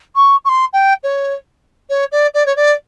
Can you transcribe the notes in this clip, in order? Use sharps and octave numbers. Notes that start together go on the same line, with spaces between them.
C#6
C#6
C6
G5
C#5
C#5
D5
D5
C#5
D5